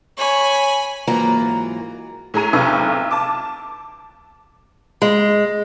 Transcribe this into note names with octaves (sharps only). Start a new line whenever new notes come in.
C#5 G#5 B5
G#2 E3 F#3 A#3 F4 A#5
A2 G#4 A#5 D#7
B1 C3 F4 A4 B4 C#6
A5 D6
G#3